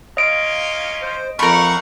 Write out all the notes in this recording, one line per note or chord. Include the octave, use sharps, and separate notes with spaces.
A#3 C#4 F4 D#5 D7
C5
F2 A3 A#4 F5 F#5 B5 C#6 F6